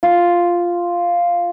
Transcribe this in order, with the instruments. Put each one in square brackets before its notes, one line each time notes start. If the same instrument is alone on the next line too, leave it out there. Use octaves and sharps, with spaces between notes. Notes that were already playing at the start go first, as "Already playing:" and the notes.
[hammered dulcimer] F4